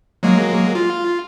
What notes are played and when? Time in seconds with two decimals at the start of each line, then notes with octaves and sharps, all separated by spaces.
0.23 F#3 G#3 A#3
0.75 F4